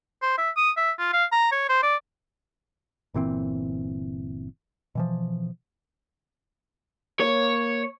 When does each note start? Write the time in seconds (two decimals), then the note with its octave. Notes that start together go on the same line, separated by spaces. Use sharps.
0.22 C5
0.38 E5
0.57 D#6
0.77 E5
0.99 F4
1.13 F5
1.32 A#5
1.52 C#5
1.69 C5
1.83 D5
3.14 G1 A#2 E3 C4
4.95 B2 E3 F3
7.20 A#3 C#5